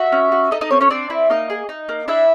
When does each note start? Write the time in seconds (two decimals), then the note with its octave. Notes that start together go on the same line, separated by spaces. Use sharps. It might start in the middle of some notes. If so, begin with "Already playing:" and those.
Already playing: F#4 E5
0.12 C#4
0.32 F#4
0.51 D#4 A4 D#5
0.61 D#4 D#5
0.71 C4 C#4 C#5
0.81 C#4 C#5
0.90 C4 D4 D5
1.10 E4
1.30 A#3 D#4 D#5
1.50 G#4
1.69 D#4
1.89 A#3
2.08 D4 E4 E5